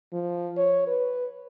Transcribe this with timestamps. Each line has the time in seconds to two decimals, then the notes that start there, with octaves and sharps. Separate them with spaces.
0.13 F3
0.57 C#5
0.87 B4